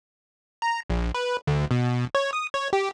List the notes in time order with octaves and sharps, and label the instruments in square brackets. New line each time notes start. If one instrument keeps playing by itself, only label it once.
[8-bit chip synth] A#5
A#1
B4
D2
B2
C#5
D#6
C#5
G4